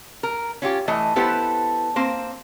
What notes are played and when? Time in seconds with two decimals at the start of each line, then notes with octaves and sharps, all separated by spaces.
0.23 A#4
0.62 C#4 F4 G4
0.88 E3 A3 D#5
1.16 B3 E4 G4 A4 B4 C5
1.96 A#3 C4 C5